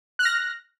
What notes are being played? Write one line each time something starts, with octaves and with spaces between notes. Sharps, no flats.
F6 F#6 A#6